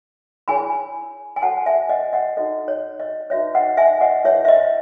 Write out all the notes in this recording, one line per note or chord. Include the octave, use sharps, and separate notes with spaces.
E4 G#4 C#5 G#5 B5
G#5
F#4 A4 C#5 F#5 A5
E5 G#5
D#5 F#5
D#5 F#5
D#4 F#4 A4 D#5
C#5
D#5
D#4 F#4 B4 C#5 E5
D#5 F#5
E5 G#5
D#5 F#5
E4 G#4 B4 C#5 E5
E5
D#5